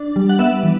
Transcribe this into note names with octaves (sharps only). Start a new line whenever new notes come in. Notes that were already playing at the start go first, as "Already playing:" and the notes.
Already playing: D4
G3
F#5
B3 E5
E3